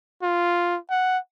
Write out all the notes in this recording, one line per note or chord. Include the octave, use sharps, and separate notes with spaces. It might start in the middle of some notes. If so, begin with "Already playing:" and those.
F4
F#5